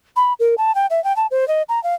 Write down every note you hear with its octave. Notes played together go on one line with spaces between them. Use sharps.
B5
A#4
A5
G5
E5
G5
A5
C5
D#5
A#5
F5